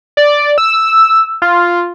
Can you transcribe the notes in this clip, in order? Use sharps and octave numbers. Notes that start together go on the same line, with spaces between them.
D5
E6
F4